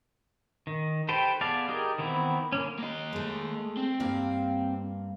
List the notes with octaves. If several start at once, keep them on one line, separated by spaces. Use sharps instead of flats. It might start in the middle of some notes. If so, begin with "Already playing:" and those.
D#3
G4 A4 B4 C5 G5
B3 G#4 D5 F5 A5
D#4 G4 G#4 A#4
D#3 E3 B3 C4 E4
D3 A#3 C#4
A#3 D#5
G#3 A3
C4
G2 A#3 F5